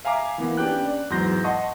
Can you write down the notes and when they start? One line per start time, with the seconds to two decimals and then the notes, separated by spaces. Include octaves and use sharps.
0.05 E5 F5 G#5 A#5 D6
0.38 E3 A#3 B3
0.57 C#4 D4 G4 B4 G5 F#6
0.85 D5
1.10 E2 G#2 F#3 C6 G6 A#6
1.44 D#5 F#5 A5 C6 C#6 D#6